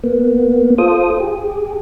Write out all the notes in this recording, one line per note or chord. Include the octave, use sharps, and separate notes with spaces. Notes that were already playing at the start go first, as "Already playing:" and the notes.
A#3 B3
F4 A4 C5 D#6
G4 G#4